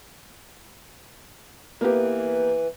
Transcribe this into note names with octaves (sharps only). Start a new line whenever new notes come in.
E3 A#3 B3 G4